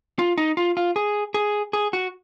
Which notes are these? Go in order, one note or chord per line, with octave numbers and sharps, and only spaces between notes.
F4
D#4
F4
F4
G#4
G#4
G#4
F#4